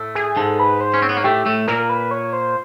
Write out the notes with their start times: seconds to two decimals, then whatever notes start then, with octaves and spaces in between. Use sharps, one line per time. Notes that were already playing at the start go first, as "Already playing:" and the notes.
Already playing: A2 A3
0.15 G#4
0.37 G#2 G#3 A4
0.59 B4
0.81 C5
0.94 C#4
1.02 C4 C#5
1.09 B3
1.17 A#3
1.24 A2 A3 G4
1.46 A2 A3
1.68 A#2 A#3 A#4
1.89 B4
2.11 C#5
2.33 C5